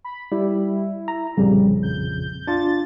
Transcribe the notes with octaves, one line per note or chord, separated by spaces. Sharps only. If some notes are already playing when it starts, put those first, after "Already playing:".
B5
G3 E4
A#5
A#1 F2 C#3 G3
G6
D4 F4 A6